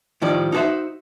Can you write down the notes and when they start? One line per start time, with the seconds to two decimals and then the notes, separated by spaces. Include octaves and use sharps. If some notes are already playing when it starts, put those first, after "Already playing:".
0.22 A2 D#3 F3 G3 D5
0.52 D#4 F#4 A4 C5 E5